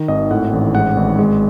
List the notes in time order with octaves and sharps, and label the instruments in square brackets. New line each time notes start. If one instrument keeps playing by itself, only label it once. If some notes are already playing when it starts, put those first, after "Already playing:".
Already playing: [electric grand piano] D#3
G#1 D#5
A2 F#5
A1
G#2 F#5
G#1
G#3